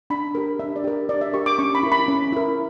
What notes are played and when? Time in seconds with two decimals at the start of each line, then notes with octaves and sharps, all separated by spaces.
0.10 D4 B5
0.35 G4 A#4
0.59 D4 E5
0.76 D5
0.84 G4 A#4
1.09 D4 D5
1.21 E5
1.33 G4 A#4 C#6
1.46 D6
1.58 C#4 C#6
1.75 B5
1.83 E4 A#4
1.92 B5
2.08 C#4
2.32 E4 A#4